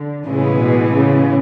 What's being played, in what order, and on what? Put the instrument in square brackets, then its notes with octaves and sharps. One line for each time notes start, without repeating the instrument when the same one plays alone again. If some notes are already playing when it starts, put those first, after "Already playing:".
Already playing: [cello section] D3
[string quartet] A2 E3 G#3 B3 [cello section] C#3
[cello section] B2
C#3